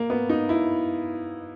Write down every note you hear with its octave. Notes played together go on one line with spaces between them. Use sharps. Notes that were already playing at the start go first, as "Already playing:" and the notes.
Already playing: A#3
B3
D#4
E4